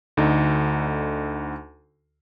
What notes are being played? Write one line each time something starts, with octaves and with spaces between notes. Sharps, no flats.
D2 D3 D#4